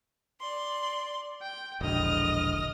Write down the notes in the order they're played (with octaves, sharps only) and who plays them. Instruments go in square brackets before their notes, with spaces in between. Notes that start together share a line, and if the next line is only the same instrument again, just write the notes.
[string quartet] D5 C6
G5
[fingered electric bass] E1 A#1 D3 [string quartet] D#5 D#6 F6